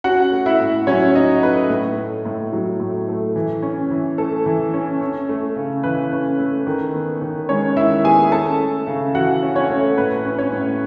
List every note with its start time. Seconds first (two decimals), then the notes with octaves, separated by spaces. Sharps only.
0.04 C#4 F#4 F#5
0.32 A3
0.46 E4 E5
0.60 A2
0.87 F#3 C#4 C#5
1.15 C#4 D#4 D#5
1.42 A3 B4
1.70 A2
1.97 A3
2.25 A2
2.53 F#3
2.80 A2
3.08 A3
3.36 E3
3.63 C#4
3.91 E3
4.18 A3 A4
4.46 E3
4.74 C#4
5.01 C#4
5.29 A3
5.56 C#3
5.83 E3 B4
6.12 C#4
6.39 A3
6.67 D#3
6.94 B3
7.22 D#3
7.49 G#3 C#4 C#5
7.76 D#3 E4 E5
8.04 B3 G#4 G#5
8.31 C#4 A4 A5
8.59 A3
8.87 C#3
9.14 E3 F#4 F#5
9.42 C#4
9.56 C#4 C#5
9.70 A3
9.98 A2 B4
10.25 C#4
10.38 C#4 C#5
10.52 A2